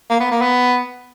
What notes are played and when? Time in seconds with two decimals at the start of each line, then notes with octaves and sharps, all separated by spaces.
0.10 A#3
0.20 B3
0.31 A#3
0.42 B3